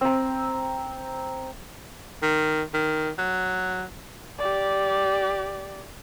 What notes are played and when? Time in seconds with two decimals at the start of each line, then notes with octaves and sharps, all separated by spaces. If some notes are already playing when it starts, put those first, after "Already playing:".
0.01 C4 A#5
2.22 D#3
2.74 D#3
3.18 F#3
4.38 G4 D5